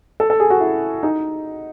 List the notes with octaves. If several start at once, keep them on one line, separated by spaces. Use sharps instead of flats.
A4
A4
G#4
F#4
E4
D#4